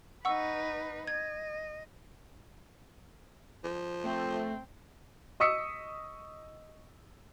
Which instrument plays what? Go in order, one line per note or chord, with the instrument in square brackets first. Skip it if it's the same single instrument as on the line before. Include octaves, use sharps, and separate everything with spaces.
[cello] D#4 B4 [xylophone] F#5 C#6 E6
[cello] D#5 [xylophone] G#6
[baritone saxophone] F3
[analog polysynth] A3 [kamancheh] C4
[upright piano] D#5 C#6 D#6 E6 B6 C#7